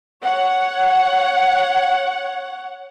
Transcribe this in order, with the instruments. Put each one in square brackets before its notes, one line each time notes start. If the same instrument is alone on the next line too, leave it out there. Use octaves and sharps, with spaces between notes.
[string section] C#5 F#5